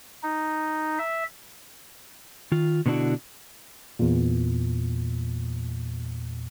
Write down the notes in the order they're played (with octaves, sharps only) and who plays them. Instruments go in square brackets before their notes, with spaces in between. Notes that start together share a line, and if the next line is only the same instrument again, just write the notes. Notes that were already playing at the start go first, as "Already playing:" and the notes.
[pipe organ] D#4
E5
[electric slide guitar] D#3 F4
B2 D3 B3 D4 E4 F#4
[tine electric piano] E2 A#2